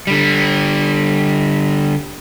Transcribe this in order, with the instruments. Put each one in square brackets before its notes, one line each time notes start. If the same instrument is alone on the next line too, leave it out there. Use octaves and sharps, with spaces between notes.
[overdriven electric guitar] D3 G3